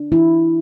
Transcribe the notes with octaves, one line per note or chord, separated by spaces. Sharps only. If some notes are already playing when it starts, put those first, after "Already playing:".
Already playing: D4
E3 E4